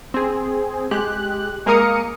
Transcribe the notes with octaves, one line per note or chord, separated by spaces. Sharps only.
C4 G#4
G#3 G4 F#6
G#3 A#3 A#4 F5 D#6 C#7